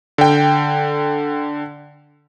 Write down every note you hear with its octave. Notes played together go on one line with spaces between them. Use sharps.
D3 G5